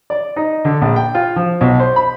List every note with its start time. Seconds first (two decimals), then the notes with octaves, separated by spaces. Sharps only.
0.10 D5
0.36 D#4
0.65 D3
0.82 A#1
0.96 G5
1.15 F4
1.36 F3
1.61 B1
1.79 C5
1.96 B5